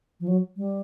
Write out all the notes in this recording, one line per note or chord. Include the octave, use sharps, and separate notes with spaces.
F3
F#3
G3